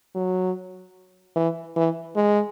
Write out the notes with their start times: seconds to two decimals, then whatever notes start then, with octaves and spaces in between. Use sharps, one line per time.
0.15 F#3
1.36 E3
1.76 E3
2.16 G#3